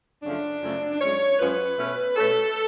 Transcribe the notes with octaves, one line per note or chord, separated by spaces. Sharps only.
F#2 C#3 F3 A3 D4
F#2 C#3 F3 A3
F#2 F3 G#3 C#5
F#2 F3 G#3 B4
B2 A3 C#4
B2 A3 C#4 A4